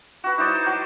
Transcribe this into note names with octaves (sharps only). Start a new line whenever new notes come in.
F#4 B4
D#4 E4 C5 D5
F#3